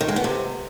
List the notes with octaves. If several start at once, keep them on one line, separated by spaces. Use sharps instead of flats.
D#3
G#3
B3
C3